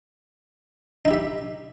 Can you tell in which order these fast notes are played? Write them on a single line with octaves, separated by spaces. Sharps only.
D#4 E4 G4 E5